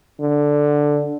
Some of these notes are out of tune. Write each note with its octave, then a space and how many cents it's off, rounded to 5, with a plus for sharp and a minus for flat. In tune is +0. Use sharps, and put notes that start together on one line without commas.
D3 +0